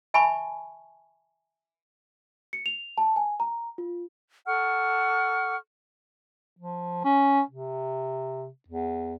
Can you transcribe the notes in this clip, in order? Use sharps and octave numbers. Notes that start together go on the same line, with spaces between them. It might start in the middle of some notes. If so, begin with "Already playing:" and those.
E5 G#5 A5 B5 C#6
C#7
F7
A5
G#5
A#5
F4
A4 F#5 C#6 F6
F3
C#4
C3
E2